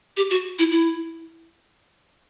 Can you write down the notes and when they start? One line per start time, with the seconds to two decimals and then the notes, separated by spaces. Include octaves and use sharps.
0.17 G4
0.30 F#4
0.59 E4
0.71 E4